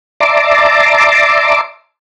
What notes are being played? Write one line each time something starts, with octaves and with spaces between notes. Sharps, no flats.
D5 E5 A5 A#5 C6 D6